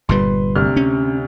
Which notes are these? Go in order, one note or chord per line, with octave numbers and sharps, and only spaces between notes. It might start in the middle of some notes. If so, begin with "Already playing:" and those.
G1 A#2 G3 B4 C6
D2 C3 F6
C#4